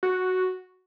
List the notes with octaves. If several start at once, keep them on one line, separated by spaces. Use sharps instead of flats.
F#4